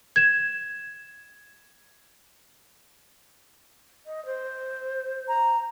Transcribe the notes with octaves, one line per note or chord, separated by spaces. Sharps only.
G#6 E7
D#5
C5
A#5